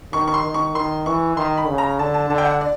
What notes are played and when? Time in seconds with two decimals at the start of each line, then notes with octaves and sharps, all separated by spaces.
0.13 D#3 C#6
0.28 C#6
0.34 C6
0.44 D#3
0.54 C#6
0.75 D#3 C6
1.06 E3 C#6
1.37 D#3 C6
1.57 B5
1.68 C#3
1.78 A#5
1.99 D3 A5
2.14 A5
2.30 D3 A5
2.38 G5
2.45 F#5
2.61 D5